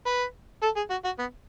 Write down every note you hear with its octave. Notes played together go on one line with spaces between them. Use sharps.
B4
A4
G#4
F#4
F#4
B3